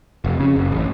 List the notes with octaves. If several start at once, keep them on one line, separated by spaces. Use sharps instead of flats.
F1
C#3
F#1
A1